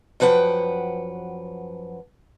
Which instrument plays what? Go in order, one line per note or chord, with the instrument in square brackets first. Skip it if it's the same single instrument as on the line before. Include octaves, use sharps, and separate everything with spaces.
[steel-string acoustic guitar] F#2 F3 B4 F#5 G5